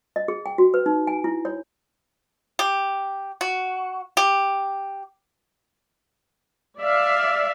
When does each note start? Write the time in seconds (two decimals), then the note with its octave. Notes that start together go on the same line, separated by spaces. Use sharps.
0.16 D#5
0.28 G#4
0.46 G5
0.58 F#4
0.74 B4
0.86 D#4
1.07 G#5
1.24 E4
1.45 C#5
2.59 G4
3.41 F#4
4.17 G4
6.80 D5 E5 F5